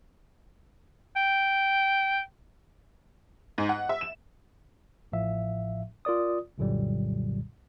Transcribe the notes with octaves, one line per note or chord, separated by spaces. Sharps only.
G5
G#2
F#5
E5
E7
A1 A2 F3 E5 F5
F4 A#4 D5 D#6
C2 F#2 A#2 D3 F#3 G3